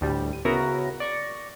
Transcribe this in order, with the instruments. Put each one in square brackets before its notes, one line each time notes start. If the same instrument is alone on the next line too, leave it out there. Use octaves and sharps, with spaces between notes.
[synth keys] D2 A2 G3
D#7
C#3 B3 E4 F#4 A#4 A#6
D5 C#6 A#6